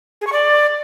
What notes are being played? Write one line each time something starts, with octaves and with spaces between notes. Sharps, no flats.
G#4
C#6
D5